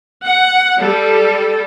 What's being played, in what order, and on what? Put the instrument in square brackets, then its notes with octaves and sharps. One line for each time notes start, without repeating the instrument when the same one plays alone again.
[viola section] F#5
G3 A4